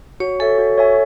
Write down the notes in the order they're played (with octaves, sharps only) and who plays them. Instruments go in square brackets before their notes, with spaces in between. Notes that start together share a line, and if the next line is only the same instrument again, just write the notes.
[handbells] F#4 [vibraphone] C#5
[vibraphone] A4 [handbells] C#5 E5 G#5
[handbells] F#4
C#5 E5 G#5